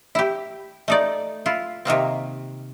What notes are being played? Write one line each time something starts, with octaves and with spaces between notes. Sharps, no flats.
E4 G4
A3 D#4 D5
E4 F4
C3 D#3 A#3 C4